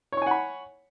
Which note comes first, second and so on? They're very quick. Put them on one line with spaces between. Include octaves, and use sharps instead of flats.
C#5 C#6 G#5 F#5 B5